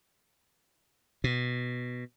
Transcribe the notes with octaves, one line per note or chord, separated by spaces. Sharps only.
B2